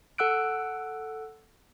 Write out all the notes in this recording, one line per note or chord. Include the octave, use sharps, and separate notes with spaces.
A4 F#5 E6 F#6 D7